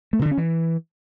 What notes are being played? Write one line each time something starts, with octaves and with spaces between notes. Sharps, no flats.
A3
C3
D3
C#4
E3